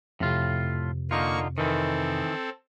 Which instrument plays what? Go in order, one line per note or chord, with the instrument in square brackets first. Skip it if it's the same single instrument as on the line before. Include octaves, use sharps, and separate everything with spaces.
[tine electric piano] F2 C3 [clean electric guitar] A2 F4
[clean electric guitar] D3 D#4 F4 [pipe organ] A#3 C#6
[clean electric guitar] D#3 E3 [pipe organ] C4 A4